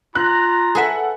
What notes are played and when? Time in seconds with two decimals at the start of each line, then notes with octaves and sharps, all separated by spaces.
0.15 F4 A#5 F#6
0.75 G#4 A4 B4 E5 F#5